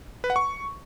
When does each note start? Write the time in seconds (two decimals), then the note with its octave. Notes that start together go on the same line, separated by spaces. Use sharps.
0.24 B4
0.30 F#5
0.36 C#6